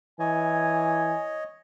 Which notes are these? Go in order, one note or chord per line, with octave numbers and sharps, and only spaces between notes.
E3 C#5 D#5 G#5